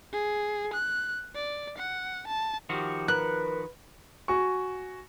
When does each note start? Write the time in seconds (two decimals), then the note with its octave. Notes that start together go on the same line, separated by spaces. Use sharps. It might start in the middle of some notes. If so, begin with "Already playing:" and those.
0.13 G#4
0.74 F#6
1.35 D5
1.78 F#5
2.28 A5
2.69 D#3 F3 F#4 G4
3.08 A#4 B4 F#6
4.28 F#4 G#5 C#6